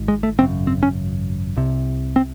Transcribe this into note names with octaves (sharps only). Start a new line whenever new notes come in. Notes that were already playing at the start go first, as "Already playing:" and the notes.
Already playing: G#1 G#2
G#3
A3
G#1 F#2 C#3 C4
C4
C#4
C2 C3
C4